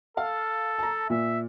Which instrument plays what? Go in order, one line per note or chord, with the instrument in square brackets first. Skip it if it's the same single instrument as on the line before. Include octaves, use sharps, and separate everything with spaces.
[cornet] A4 [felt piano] F5
[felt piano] A5 A#5
[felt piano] A#2 [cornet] E5